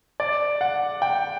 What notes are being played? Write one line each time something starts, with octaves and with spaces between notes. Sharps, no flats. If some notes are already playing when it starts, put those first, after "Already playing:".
D5
F#5
G5